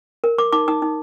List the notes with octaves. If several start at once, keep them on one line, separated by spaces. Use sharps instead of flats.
A#4
A#4 D6
D#4 D6
D#4 D#6
D#4